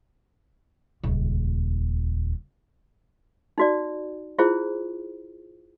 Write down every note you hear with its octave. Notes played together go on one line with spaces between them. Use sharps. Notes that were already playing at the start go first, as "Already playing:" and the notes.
D#1 C#2
D#4 F#4 D5
E4 F4 G#4 C5